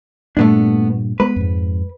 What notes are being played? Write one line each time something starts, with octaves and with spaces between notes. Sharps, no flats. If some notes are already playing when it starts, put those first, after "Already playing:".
G2 A#2 A3 B3 D4
G#3 B3 B4
F2 G#2